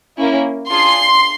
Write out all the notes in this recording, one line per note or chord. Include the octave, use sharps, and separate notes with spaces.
A#3 C#4 E4
D4 F4 G#4 C6